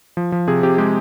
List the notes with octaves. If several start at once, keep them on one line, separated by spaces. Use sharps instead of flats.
F3
F3
C3 G#4
C3 G4
G#3 G4